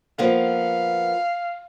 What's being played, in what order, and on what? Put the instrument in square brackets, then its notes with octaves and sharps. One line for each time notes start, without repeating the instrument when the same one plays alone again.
[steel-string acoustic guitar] F3 A#3 B3 [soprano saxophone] F5